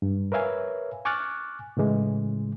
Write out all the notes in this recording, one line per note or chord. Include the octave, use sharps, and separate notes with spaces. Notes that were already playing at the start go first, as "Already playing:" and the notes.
G2
A#4 B4 C#5 E5 F5 G#5
G#5 C#6 D6 F6 F#6 A6
A2 C#3 E3 G#3